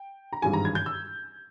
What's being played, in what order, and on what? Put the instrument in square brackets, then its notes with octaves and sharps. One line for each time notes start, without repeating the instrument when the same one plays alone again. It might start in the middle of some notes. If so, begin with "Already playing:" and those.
Already playing: [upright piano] G5
A#5
G#1 G2 E3 G#3 G#5
A#5
G#6
G6
E6